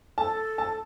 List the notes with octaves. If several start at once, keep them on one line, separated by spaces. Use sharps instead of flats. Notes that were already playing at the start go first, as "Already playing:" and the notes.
A4 A5
A5